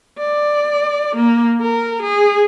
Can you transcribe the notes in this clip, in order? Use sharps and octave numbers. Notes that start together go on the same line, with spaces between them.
D5
A#3
A#4
G#4